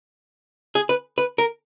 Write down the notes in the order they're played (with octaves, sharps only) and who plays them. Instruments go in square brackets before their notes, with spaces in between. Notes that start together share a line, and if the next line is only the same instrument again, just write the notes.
[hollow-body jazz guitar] G#4
B4
B4
A#4